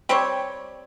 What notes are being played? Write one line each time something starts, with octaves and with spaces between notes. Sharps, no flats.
G3 C4 G4 C#5